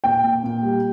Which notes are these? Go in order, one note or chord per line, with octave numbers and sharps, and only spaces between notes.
A#2 G5
A#2
A#2
G3